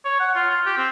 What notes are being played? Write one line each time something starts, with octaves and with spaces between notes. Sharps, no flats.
C#5
F#5
F4
F4
G4
C4